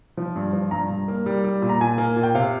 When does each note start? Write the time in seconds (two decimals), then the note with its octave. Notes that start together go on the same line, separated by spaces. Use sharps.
0.17 F3
0.36 G2
0.53 F3
0.71 G2 A#5
0.90 G2
1.08 A#3
1.26 G3
1.44 G3
1.62 A#2
1.69 A#5
1.81 A#2 G#5
1.98 A#3
2.16 A#2
2.23 G5
2.35 C3 F5